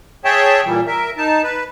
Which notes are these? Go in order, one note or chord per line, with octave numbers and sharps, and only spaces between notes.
G#4 C#5 E5 G5 A5
A#2 E3 G3
A#4 E5
D#4 A5
B4